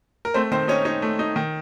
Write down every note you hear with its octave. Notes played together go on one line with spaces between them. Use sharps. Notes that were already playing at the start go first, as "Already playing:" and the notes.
A#4
A3 C4 C5
D#3 C4 C5
C#4 D#4 C#5
C#4 D#4 C#5
A3
D#4
D#3